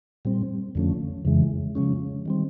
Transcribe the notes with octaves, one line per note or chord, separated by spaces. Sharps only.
A#2 G3 C4
F2 D3 F3 A3 C#4
F2 C#3 E3 G#3
C#3 F3 G#3 C#4
D#3 G3 C4